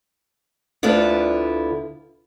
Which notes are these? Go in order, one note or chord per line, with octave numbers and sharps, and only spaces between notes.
D2 D3 B3 E4 F4